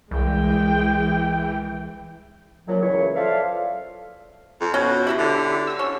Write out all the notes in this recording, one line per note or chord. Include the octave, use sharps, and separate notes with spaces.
C2 E3 G#3 G5
F#2 A#2 F3 F#3
C#2 E3 C#5
F4 A4 C5 D5 E5 F5
F2
B2 C#4 F#4
F#3 E4 G4 E5 F#5
D3
E6
C#4